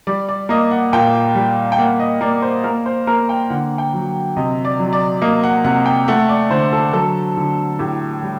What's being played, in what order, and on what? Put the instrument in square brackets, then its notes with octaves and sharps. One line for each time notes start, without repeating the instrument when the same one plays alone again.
[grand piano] G3 D5
D5
A#3 D#5
F#5
A#2 G5
G3
G5
A#3 F#5
D#5
A#3 D5
C5
A#3 A#4
C5
A#3 A#4
G5
D3 F#5
G5
F#3
C3 D#5
D5
F#3
D5
A#3 D#5
F#5
C3 F#5
G5
A3 F#5
D5
D3 C5
A4
F#3 A4
D3
A2 G4
G3